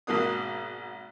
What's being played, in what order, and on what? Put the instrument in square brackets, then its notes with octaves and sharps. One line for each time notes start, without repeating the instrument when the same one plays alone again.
[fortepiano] G#1 B2 A#3 D4 D#6